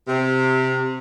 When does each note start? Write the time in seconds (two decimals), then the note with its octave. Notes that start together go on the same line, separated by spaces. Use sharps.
0.07 C3